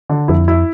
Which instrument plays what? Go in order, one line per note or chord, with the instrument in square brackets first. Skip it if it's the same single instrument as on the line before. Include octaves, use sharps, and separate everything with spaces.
[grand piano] D3
[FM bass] F2 [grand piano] E4
[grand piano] E4